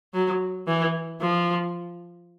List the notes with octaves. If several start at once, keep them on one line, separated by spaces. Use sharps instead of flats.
F#3
E3
F3